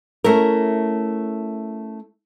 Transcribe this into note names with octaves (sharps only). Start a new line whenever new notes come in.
A3 C#4 E4 A#4